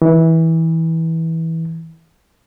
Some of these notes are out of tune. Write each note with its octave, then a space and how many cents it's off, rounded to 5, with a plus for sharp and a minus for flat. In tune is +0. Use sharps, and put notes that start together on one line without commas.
E3 -20